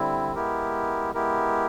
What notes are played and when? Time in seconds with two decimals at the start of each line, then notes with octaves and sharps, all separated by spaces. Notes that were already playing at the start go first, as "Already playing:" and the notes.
Already playing: D3 G3 C4 E4
0.35 G#3 B3 E4 G4 A#4
1.14 G#3 B3 E4 G4 A#4